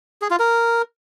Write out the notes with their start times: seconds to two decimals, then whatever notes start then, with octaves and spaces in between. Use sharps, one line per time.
0.22 G#4
0.31 F4
0.39 A#4